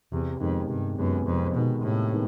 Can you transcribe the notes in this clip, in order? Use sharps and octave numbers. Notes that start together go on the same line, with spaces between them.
E2 C3
F2 D#3 G#3 B3
G2 C3
F#2 D#3 G#3 B3
F2 C3
B2 D#3 G#3 B3
A2 C3
D#3 G#3 B3